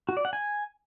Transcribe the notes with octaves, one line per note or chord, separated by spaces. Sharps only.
F#4
D5
F#5
G#5